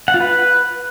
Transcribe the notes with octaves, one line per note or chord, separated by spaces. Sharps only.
F#5
F4
B4